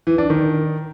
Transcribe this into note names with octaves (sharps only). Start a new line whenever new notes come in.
E3
D4
D#3